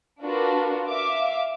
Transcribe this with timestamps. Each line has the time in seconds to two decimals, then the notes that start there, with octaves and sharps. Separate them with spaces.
0.22 D4 F4 F#4 A#4 B4
0.87 E5 F5 D6